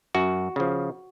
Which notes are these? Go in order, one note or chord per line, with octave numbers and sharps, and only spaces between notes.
F#2 F#4
C#3 F3